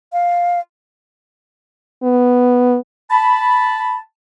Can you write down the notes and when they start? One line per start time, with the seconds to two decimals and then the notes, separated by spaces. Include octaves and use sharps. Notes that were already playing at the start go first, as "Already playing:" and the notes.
0.13 F5
2.03 B3
3.10 A5 B5